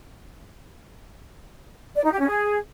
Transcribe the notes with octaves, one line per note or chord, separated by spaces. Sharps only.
D5
D#4
G4
C#4
G#4